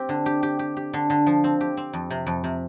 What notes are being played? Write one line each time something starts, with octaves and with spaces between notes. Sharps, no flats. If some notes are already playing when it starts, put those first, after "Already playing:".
Already playing: C4 G4
D3
G4
G4
G4
G4
D3
D3
F3
C4
G4
C4
F2
C3
F2
C3